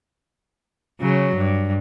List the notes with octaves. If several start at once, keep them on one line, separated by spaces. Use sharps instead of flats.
C#3 F#3
G2